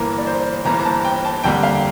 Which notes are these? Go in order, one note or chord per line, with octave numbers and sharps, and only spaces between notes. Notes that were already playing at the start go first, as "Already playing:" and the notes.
Already playing: G1 G2 E3 A#3 A#4
D5
C5
G1 G2 E3 A#3 A#5
A#5
A5
G5
A5
F2 D3 G3 A#3 G5
F5